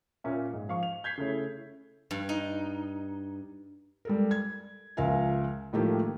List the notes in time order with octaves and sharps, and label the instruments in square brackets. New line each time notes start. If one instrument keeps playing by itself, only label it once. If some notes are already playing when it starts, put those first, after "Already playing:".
[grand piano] A#2 A#3 C#4 E5
G#2
F3 F5 C#6
F7
G6 G#6 B6 C7
C#3 A3 E4 C#5
[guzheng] G2
D#4
[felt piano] G3 A4 A#4
G#6
C#2 F3 A#4 E5 F5 G#5
A2 D#3 F3 A3 A#3 G4